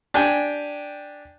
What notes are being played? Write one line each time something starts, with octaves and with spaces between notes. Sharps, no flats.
D4 G4 G5 G#5